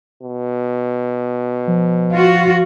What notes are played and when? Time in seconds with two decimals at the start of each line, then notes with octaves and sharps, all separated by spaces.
0.23 B2
1.67 F3
2.13 F4 F#4